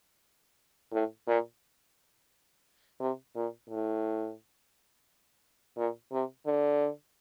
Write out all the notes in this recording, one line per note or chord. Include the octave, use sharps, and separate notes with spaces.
A2
A#2
C3
A#2
A2
A#2
C3
D3